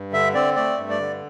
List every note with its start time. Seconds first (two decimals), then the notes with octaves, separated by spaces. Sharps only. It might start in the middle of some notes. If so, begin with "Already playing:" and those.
Already playing: G2
0.13 D3 E5
0.34 C4 D5
0.56 A3 D5
0.78 G2
0.89 D5
1.00 D3